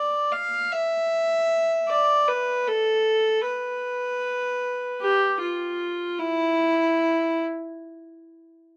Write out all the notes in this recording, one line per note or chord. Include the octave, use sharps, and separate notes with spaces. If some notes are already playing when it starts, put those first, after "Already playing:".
Already playing: D5
F5
E5
D5
B4
A4
B4
G4
F4
E4